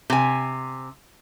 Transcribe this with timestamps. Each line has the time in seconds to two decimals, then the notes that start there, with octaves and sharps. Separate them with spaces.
0.10 C3 G#5